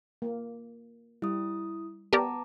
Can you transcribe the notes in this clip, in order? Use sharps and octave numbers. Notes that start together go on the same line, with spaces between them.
A#3
G3 E4 D#6
B3 G4 A#4 D5 A5 A#5 D6